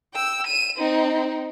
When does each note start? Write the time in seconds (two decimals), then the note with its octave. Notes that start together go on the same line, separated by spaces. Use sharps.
0.14 G5 E6
0.47 D#7 E7
0.78 C4 D#4